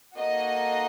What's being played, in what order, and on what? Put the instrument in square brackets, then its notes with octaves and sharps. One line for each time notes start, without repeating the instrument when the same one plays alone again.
[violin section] A#3 D#4 F#4 A4 D#5